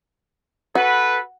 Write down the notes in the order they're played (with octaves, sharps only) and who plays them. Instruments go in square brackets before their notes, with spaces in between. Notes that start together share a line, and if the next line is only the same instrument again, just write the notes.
[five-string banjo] F#4 [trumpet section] A4 B4